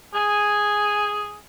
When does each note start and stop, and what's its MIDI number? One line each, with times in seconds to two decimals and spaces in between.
0.14 1.36 68
0.14 1.12 80